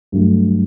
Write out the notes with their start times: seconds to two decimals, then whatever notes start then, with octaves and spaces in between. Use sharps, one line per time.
0.12 G2 F#3 A3